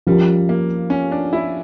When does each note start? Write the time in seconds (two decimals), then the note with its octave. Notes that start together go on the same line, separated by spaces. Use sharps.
0.07 F3 G3 C#4 G4 A#4
0.49 A#3
0.90 C#4
1.12 D4
1.33 E4